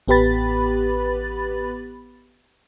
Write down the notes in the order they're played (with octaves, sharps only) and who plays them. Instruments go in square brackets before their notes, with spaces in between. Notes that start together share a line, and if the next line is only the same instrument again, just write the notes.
[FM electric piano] A1 B3 G4 B4 B5 A6